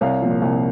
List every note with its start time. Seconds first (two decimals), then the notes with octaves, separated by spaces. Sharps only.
0.01 C2 C#5 F5
0.22 A#2 F3
0.42 C2